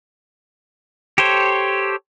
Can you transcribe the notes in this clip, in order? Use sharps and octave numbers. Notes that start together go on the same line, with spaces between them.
G4 A4 C5 C#5